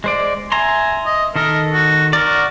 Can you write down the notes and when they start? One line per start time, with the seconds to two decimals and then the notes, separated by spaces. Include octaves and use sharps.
0.04 G#3 C5 D5
0.52 E5 G#5 A#5 C6
1.06 D#5
1.36 D#3 A4 A#4 D#5
1.73 F#4
2.13 F#4 A#4 D5